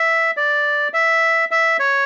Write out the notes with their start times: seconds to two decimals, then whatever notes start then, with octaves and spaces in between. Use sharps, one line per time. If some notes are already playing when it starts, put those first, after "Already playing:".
Already playing: E5
0.37 D5
0.94 E5
1.51 E5
1.79 C#5